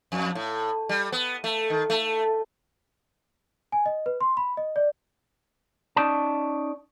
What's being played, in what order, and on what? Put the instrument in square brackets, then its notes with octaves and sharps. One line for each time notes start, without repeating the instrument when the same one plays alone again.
[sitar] F2
A2
G3
B3
A3
D#3
A3
[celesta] G#5
D#5
B4
C6
B5
D#5
D5
[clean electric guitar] C#4 D#4 D5 A5